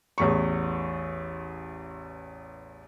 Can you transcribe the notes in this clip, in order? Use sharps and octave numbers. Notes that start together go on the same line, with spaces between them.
A1 E2 C#6